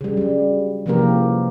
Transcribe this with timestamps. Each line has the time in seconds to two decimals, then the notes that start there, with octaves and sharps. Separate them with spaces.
0.01 C#3 G3
0.17 F#3 G3
0.86 C3 E3 F3 A#3 G4 A#4